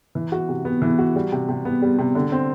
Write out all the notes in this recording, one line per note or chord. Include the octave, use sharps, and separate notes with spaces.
E3
F#4
C3
B3
E3
F#4
G3
C3
C3
B3
G3
C3
D3
C4